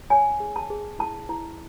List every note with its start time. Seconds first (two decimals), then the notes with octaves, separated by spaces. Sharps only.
0.10 C#5 G#5
0.40 G#4
0.56 A5
0.70 G#4
0.99 E4 A5
1.29 E4